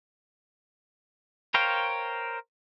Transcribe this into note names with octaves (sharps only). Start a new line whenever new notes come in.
A#4 C5 C#5 F5 G5